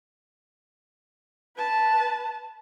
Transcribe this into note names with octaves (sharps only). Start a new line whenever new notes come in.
B4 A5